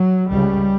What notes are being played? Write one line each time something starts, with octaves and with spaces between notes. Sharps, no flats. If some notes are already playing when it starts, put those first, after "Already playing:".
Already playing: F#3
C#2 C#3 G3